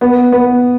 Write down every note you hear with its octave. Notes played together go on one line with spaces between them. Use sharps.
B3
B3